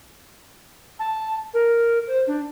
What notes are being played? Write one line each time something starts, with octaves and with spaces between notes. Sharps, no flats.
A5
A#4
C5
D4